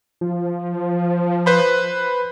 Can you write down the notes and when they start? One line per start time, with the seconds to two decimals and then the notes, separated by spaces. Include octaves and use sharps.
0.21 F3
1.46 B4 C5 B5